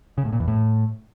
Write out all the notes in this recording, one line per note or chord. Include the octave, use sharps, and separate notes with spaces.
C#3
A2
A#2
E2
A2